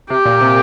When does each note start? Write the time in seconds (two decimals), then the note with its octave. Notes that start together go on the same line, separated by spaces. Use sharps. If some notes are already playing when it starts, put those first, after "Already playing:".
0.10 C3 G4
0.25 A#2
0.41 C3